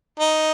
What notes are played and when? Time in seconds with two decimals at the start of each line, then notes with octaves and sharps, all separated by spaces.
0.20 D#4